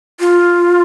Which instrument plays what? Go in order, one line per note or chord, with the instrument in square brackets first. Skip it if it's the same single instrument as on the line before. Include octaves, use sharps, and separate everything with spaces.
[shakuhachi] F4